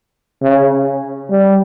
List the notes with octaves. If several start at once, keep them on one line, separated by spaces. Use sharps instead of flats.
C#3
G3